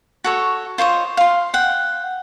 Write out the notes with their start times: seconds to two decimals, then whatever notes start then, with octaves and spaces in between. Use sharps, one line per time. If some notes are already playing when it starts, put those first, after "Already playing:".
0.24 F#4 A4 C#5
0.78 F4 C5 C#5 D#5
1.17 F5 C6
1.54 F#5 G5